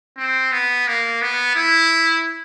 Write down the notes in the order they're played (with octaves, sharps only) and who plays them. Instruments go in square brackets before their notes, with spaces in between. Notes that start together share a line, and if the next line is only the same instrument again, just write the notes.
[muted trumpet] C4
B3
A#3
B3
E4